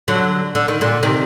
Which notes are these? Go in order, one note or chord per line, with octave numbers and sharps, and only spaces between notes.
D3 F#3
D3
D#3
A#2 D3
C3 D#3